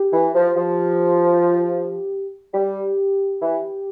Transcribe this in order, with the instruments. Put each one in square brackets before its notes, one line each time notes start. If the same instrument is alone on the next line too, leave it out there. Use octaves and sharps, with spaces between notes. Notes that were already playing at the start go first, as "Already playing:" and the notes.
Already playing: [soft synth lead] G4
[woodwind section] E3
F3
F3
[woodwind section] G3 [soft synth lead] G4
[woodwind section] E3